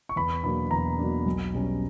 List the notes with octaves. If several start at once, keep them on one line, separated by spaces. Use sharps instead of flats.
C#6
E2 B5
B2 F#3 A#3 D4 B5
E2 A#5
B2 F#3 A#3 D4
B1
B2 G3 C#4